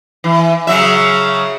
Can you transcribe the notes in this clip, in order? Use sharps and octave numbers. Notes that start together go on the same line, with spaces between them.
E3
C#3 F#3 E5